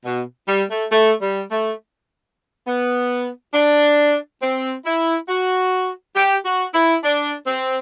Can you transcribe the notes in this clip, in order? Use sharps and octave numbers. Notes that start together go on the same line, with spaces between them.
B2
G3
A3
A3
G3
A3
B3
D4
C4
E4
F#4
G4
F#4
E4
D4
C4